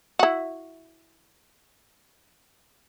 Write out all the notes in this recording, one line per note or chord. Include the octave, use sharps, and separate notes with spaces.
E4 F#4